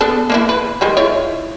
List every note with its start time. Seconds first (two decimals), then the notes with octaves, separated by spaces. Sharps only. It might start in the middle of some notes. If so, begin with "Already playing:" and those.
0.01 B3 D4 A4
0.30 A#3 D4 E4
0.49 B4
0.81 D#3 G3 G#3
0.97 E4 F4 C#5